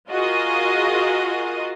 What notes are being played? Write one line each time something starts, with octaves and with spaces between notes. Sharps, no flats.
F4 F#4 G#4 A#4 D#5 F5